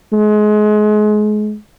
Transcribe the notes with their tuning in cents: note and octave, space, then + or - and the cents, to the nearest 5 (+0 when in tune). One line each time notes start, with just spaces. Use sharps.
G#3 +30